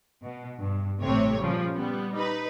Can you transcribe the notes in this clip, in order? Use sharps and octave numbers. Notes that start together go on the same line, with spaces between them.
B2
G2
A1 C3 A3 C4 C#5
A#2 C#3 F3 G3
G3 B3
D#4 B4